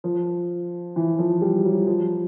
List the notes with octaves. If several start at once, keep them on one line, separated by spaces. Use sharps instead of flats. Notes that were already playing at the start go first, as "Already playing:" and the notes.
F3
E3
F3
G3
F#3
F3